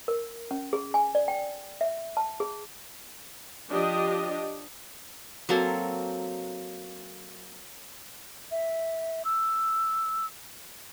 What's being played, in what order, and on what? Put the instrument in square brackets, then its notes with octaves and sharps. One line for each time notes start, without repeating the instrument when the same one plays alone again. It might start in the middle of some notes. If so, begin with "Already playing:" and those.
[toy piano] A#4
C#4
G#4
G#5
D5
G5
E5
A5
G#4
[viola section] F3 D4 G4 D#5
[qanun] F#3 A#3 C4 A4
[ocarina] E5
E6